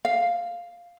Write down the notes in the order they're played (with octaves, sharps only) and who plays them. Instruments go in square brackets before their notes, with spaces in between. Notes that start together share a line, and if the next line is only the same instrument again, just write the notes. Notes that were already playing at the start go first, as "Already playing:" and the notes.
[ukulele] F5